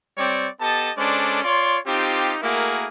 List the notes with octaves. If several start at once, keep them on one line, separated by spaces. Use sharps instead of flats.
G3 C4 C#5 D5
B3 G4 A4 D#5 A5
G#3 C#4 D4 A4 C5 D5
F4 C#5 D5 C6
C4 D#4 F4 G4
A3 A#3 E4 F#4 G#4 A#4